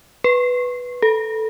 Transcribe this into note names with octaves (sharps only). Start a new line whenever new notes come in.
B4
A4